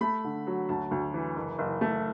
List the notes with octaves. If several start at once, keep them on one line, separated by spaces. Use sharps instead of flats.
A3 B5
D3
F#3
D2 A5
D2
E3
F#1
F#1
A3